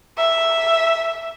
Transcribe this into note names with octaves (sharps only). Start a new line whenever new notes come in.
E5